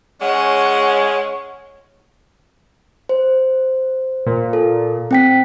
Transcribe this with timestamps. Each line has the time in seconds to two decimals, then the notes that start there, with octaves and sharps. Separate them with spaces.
0.22 G#3 C#4 C#5 F#5
3.09 C5
4.26 A#2
4.53 A4
5.11 C4 G5 B6